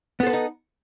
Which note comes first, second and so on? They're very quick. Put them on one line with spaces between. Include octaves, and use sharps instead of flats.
B3 A4 C5 B4 D#4